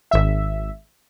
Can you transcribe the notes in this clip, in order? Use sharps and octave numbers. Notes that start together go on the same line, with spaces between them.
G#1 E5